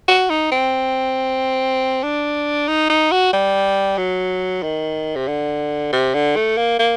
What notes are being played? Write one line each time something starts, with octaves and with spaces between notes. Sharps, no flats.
F#4
D#4
C4
D4
D#4
D#4
F#4
G3
F#3
D#3
C3
D3
C3
D3
A3
A#3
A#3